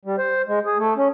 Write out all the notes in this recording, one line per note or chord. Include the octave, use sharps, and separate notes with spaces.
G3
C5
G#3
G#4
A3
C#4